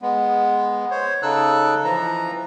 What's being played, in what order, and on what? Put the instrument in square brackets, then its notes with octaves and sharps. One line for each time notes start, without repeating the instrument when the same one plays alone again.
[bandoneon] G#3 B3
C5 C#5
C#3 D#4 A4 E6 F#6
E3 F3 A#5